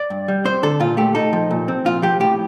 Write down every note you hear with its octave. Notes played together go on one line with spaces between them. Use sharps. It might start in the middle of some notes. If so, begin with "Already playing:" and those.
Already playing: D5
G2
G3
C4 C5
D3 A4
A#2 F4
A3 G4
D#4 A4
F3
A#2
C4
A#2 F4
F3 G4
A2 G4